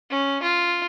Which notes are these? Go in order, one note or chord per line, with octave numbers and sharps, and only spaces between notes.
C#4
F4